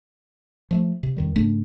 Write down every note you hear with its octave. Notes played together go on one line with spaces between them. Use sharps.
F3 G#3 A3
C3
F2 D#3 G3
G#2 C#3 A3 D4